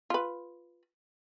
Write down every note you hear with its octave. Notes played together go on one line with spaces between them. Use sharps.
F4 B4